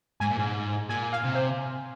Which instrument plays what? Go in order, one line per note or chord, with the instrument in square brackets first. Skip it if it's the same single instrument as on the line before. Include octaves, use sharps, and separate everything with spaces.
[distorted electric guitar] G#2 [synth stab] G#5
[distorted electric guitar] A#2
G#2
[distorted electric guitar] A#2 [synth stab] G#5
[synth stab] F5
[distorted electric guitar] C3
[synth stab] C5